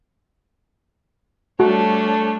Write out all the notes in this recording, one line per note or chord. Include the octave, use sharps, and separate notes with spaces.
G3 A3 D4 F#4 C#5